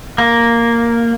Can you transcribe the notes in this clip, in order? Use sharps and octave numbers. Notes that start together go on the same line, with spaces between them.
A#3